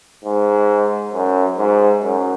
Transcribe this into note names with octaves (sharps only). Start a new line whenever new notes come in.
G#2
F#2
G#2
F#2